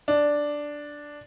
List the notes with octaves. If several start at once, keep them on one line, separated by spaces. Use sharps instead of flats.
D4